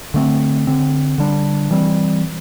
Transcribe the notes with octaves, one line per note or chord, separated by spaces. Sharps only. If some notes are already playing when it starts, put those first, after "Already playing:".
D3 A3 C4
D3 C4
D3 G3 D4
E3 G3 C4